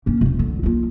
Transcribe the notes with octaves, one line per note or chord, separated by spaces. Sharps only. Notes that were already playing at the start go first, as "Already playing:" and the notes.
A#3 C#4
D#1 G#1
D3
A#3 F4